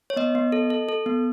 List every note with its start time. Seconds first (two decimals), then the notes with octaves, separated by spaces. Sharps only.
0.10 C#5
0.16 B3 D#5
0.35 B3
0.52 A4
0.70 A4
0.89 A4
1.06 B3